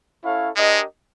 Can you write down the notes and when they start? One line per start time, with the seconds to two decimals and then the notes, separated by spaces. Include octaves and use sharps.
0.22 C#4 E4 A4 C#5 F5
0.56 G#3 D4 G4 A#4 D#5